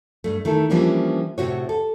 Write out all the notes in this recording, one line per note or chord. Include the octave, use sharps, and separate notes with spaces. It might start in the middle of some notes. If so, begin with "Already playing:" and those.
G2 A3
D#3 A3 E4 A4
E3 F3 G3 A#3 C#4 D4
A2 C3 F#4 C#5
A4